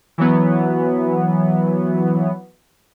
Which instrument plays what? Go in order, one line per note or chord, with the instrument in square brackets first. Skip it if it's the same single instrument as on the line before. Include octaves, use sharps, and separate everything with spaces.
[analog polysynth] E3 F#3 B3